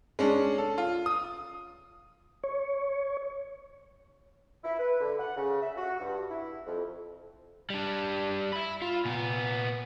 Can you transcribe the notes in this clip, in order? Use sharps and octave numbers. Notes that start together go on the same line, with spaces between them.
G#3 C#4 D4
A4
F4
D#6
C#5
E4
B4
D3
F#5
C#3
E5
F#4
G2
E4
F2
G3 D4
E5 B5
F4
A#2 B3